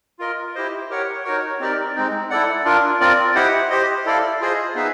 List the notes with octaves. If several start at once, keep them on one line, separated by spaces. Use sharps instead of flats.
F4 A#4 D#5
E4 G4 C5 D#5
G4 A#4 C#5 F#5
D#4 F#4 A#4 C#5
C4 D#4 G4 A#4 D5
G#3 C4 D#4
E4 A4 D5 F#5
D4 F4 A#4
C4 F4 A#4 D5
E4 G4 C5 D#5 F#5
G4 C5 D#5
E4 A4 D5 F5
F4 G#4 C5 D#5
B3 D#4 G#4 B4 E5